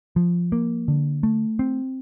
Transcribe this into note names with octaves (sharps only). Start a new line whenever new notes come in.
F3
A#3
D3
A3
C4